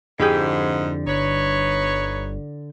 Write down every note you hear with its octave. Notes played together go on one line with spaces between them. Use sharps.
F2 G#2 D3 E4 G4 G#4 G6
G1 D#4 B4 C#5